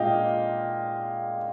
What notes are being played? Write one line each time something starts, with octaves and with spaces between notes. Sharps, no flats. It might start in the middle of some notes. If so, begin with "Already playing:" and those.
Already playing: A#2 G#3 D4 D#5 F5 G5